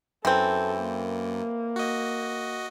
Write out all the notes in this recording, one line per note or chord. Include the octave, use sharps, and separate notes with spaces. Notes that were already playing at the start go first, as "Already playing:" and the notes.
F#2 E3 C4 A4
A#3
F#4 D#5